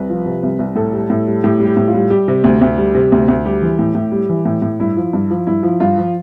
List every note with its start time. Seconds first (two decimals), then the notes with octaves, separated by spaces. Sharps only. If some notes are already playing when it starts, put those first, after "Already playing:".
Already playing: C2 B4
0.10 F3
0.26 C3
0.43 C2
0.59 C2
0.76 A2 A4
0.93 G3
1.10 A2
1.27 G3
1.44 A2 G4
1.60 G3
1.65 G4
1.77 A2
1.88 F4
1.94 G3
2.10 G3 G4
2.28 C3
2.44 D2
2.61 D2
2.78 G3
2.95 C3
3.12 D2
3.28 D2
3.45 G3 G4
3.62 E3
3.79 A2
3.95 A2
4.12 G3
4.29 E3
4.46 A2
4.62 A2
4.80 G2 E4
4.97 F3
5.13 G2
5.30 F3
5.47 G2 E4
5.63 F3
5.80 G2 F4
5.98 F3